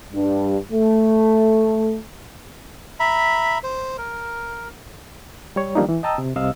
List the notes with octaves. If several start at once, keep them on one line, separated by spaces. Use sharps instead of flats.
G2
A3
E5 A#5 B5
C5
A#4
G3 C#5
D#3 F3 G3 A#3 D4 D#4
E3
D#5 G5 A5 A#5 D#6 E6
C3
C2 C3 D#5 F5 E6